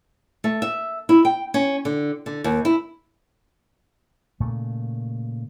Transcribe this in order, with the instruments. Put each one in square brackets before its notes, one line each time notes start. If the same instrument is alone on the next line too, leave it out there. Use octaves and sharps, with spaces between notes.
[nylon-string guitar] A3
E5
E4
G5
C#4
D3
D3
D#2
E4
[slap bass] A#2 C#3 A3